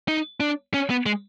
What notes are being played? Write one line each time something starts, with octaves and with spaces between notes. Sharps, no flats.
D#4
D4
C#4
B3
G#3